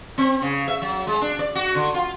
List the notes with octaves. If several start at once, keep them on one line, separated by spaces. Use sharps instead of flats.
C4
C#3
E5
F#3
G#3
D4
D5
F#4
D3
F4